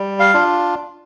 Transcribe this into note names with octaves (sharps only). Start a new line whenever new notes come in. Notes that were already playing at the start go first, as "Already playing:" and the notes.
Already playing: G3
F5
D4 F4